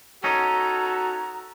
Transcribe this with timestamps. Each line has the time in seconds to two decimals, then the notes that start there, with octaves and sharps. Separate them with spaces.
0.24 C#4 D#4 F#4 A4 A#5